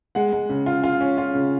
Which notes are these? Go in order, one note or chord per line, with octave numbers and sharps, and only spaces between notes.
G#3 F#5
G#3
C#3
F4
F4
C#4
F4
C#3